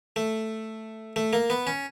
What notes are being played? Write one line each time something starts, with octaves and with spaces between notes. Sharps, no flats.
A3
A3
A#3
B3
C#4